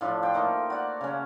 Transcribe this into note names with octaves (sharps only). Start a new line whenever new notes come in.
A2 F3 D4 F4
C5 G5
A3 A#3 D#4
F#4 D5 F#5
C#3 C#4